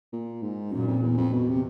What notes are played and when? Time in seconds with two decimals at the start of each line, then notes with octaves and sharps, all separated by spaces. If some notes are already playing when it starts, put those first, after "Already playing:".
0.13 A#2
0.43 G#2
0.72 F#2 A#2
0.88 F2
1.02 E2
1.18 F2
1.33 E2 B2
1.48 C3